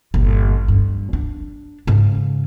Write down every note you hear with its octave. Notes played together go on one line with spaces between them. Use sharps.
G1 A#2
G2
D4
G#2 C#3